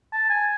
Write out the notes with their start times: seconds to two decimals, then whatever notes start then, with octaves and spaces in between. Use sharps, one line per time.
0.13 A5
0.30 G#5